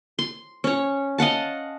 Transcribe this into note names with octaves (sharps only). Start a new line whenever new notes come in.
C6
C#4 C#5
D#5 F5 F#5 A5